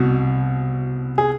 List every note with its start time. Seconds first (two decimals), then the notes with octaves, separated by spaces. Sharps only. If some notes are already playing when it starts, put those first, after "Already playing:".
Already playing: C2 B2 F#4
1.18 G#4